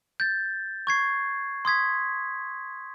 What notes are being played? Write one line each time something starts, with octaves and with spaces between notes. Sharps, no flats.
G6 A6
C#6 G#6 C7
C6 D#6 G#6 B6